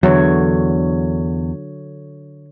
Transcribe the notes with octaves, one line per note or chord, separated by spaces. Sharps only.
E2 D3 F#3 C#5